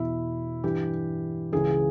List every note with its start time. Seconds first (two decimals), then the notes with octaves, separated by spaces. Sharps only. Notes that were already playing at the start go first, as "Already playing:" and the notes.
Already playing: E2 B2 E4
0.64 G2 E3 G4
1.52 C#2 C#3 E3 G#4